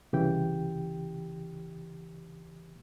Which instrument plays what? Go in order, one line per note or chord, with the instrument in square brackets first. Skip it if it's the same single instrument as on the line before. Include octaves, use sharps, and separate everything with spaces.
[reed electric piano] C2 C#3 E3 G4 G5